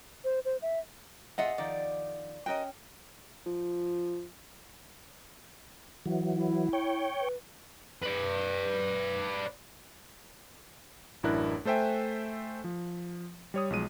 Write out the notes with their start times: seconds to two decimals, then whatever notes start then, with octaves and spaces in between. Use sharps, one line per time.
0.24 C5
0.45 C5
0.62 E5
1.38 A#2 F4 G#4 D#5 E5 F#5
1.58 D#3 F3 D5
2.46 C#4 F#4 A#4 D#5 G5
3.46 F3
6.06 E3 F#3
6.34 E4
6.73 C#5 G5
7.21 B4
8.02 B4 D5
11.23 A1 F#2 D4 E4 A#4 F#6
11.65 A3 A4 C5 E5 G5 G#5
12.64 F3
13.54 G3 C#5 D#6
13.70 B1 F3 G#3 D#7